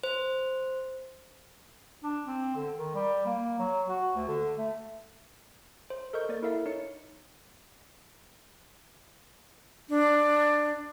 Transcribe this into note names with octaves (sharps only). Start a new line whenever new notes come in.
C5
D4
C4
D3
D#3
G3
A#3
F#3
F#4
D2
D3
A3
C5
A4 A#4 D#5 C#6 G6
A#3 D5 A6
E4 A4 A#4 E5 F5
D#4 C#5 C#7
D4